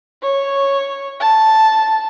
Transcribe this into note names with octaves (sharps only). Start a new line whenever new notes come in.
C#5
A5